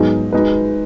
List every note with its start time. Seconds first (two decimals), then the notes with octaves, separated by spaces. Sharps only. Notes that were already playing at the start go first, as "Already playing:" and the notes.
Already playing: G#2 F#3 B3 D#4 G#4
0.33 G#3 D#4 F#4 B4